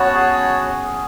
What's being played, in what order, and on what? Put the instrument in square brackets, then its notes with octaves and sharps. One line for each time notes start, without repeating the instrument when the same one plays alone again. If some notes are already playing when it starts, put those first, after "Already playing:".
Already playing: [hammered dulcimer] B3 C#4 [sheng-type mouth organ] F#4 C#5 F#5 A5
[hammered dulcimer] G#4